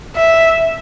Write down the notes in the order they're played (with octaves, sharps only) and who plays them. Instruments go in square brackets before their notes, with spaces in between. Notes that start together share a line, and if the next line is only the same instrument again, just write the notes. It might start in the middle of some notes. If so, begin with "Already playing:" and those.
[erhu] E5